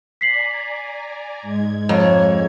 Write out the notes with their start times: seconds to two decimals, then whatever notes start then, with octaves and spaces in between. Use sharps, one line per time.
0.21 D5 G#5 A#5 B6 C7 F#7
1.42 G#2 G#3 G#6
1.89 F2 C#5 F5 A#5